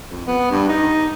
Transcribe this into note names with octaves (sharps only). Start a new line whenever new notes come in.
F2
B3
G2
D#4